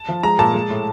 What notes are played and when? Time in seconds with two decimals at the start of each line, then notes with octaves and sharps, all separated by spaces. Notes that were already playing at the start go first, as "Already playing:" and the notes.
Already playing: A5
0.08 F3
0.23 G#3 A#5
0.39 A#2 A5
0.54 G#3
0.70 A2